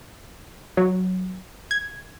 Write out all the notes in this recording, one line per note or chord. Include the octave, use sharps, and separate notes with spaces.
F#3
G#6